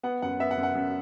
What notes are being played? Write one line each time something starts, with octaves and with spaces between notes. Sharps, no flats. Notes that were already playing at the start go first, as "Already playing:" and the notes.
B3 F#5
F#2 F#5
B3 E5
F#5
F#2
F#5
F#2